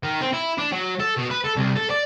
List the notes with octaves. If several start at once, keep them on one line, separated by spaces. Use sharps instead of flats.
D#3
C4
E4
D4
F#3
A4
B2
B4
A4
C2
A4
D5